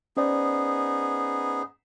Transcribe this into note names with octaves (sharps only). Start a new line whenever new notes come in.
B3 C#4 D#4 G#4 C5 D5